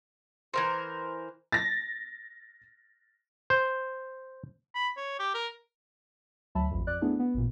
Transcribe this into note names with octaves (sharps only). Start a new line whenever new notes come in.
E3 A#4 C5
A6 A#6
C5
B5
C#5
G4
A#4
D2 F#3 E5 A5 B5
A1 F2
F2 D5 F#6
A3 B3 D4 E4 G#4
B3
A1 A#2